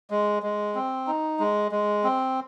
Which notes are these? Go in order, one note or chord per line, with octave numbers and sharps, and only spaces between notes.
G#3
G#3
C4
D#4
G#3
G#3
C4